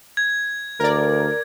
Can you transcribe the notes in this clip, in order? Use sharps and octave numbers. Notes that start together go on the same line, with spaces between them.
G#6
D2 A#4 D5